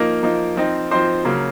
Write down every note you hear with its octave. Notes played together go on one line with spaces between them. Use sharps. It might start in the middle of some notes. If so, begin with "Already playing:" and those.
Already playing: F3 A#3 D#4 A#4 A#5
F3 A#3 D#4
F3 C4 D#4
F3 C4 D#4 C5 C6
C#3 F#3 A#3